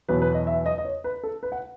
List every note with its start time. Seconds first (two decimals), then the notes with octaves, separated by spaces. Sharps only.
0.08 E2 B2 F#3 B4
0.22 B4
0.34 D#5
0.47 E5
0.66 D#5
0.78 D#5
0.85 C#5
1.04 B4
1.23 A4
1.43 B4
1.52 F#5